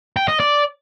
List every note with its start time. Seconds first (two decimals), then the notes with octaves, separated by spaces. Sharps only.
0.17 G5
0.28 D#5
0.40 D5